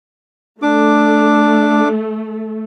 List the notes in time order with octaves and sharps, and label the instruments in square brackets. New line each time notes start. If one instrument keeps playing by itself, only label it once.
[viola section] A3 [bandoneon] D4 D6